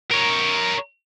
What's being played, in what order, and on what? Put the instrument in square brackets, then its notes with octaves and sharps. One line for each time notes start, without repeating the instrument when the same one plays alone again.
[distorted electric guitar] A#4 C#5